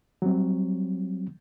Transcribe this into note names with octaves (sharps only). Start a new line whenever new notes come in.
F#3 G3 C4